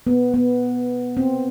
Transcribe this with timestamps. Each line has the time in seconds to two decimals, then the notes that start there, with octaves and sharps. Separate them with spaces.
0.07 B3
0.34 B3
1.17 C4